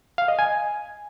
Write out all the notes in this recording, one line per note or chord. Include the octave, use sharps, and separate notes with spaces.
F5
D#5
G#5